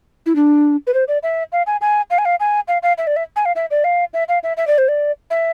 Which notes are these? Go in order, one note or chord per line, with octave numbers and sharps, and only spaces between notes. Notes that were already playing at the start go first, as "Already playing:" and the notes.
E4
D4
B4
C5
D5
E5
F5
G#5
G#5
F5
G#5
F5
G#5
F5
F5
E5
D5
E5
G#5
F5
E5
D5
F5
E5
F5
E5
E5
D5
C5
D5
E5